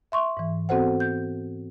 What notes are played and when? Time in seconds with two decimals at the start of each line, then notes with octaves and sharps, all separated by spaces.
0.12 E5 C6 C#6
0.37 G#2 E3
0.69 B3 C4 F#4 A4 C5 F#5
1.00 G6